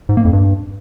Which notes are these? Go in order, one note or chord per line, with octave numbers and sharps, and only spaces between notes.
G#2
A#3
F2
G2